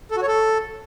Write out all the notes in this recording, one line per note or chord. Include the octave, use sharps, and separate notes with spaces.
A4
F#4
C#5
A4